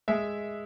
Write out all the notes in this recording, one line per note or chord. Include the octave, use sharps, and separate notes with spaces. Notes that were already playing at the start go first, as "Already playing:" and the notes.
G#3 E5